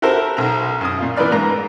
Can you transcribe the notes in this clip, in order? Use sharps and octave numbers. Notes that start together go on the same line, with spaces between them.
E4 F#4 G4 A4 A#4 C5
B1 A#5
F#2 D#6
A#2 F4
E3 A#4 B4 D5 F6
G#2 A#3 A#5